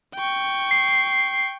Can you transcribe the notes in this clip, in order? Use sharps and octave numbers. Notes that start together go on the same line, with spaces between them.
G5 C#6
C7